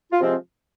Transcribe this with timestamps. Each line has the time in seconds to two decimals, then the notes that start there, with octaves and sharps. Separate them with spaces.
0.11 F4
0.20 C3 F3 G#3 C4